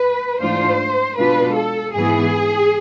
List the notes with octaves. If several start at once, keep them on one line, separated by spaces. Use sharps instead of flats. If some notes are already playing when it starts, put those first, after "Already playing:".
Already playing: B4
G#2 E3 A3 D4 F4 C5
B2 G#3 D4 F4 B4
A4
G#2 E3 B3 G#4